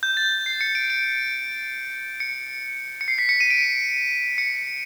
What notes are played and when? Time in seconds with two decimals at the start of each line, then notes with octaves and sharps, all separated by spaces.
0.03 G6
0.17 A6
0.46 C7
0.61 C#7
0.75 D7
0.90 D7
2.20 C#7
3.01 C#7
3.08 C7
3.18 B6
3.29 C#7
3.40 D#7
3.50 D7
4.38 C#7